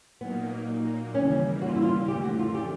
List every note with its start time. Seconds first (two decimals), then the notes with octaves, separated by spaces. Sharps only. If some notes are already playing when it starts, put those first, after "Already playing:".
0.20 A#2 F#3 A#3 B3 D#4
1.14 D#2 C#3 E3 G3 A#3 C#4
1.62 F#4
1.68 F4
1.76 E4
1.82 F4
2.08 F#2 D3 F3 A3 G4
2.23 F#4
2.39 F4
2.55 G4